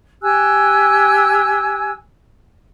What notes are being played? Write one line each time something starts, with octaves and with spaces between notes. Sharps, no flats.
G4 G#5 E6 F#6